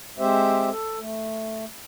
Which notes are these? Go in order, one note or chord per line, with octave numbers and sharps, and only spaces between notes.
G#3 C4 G4 C5 E5
A4
A3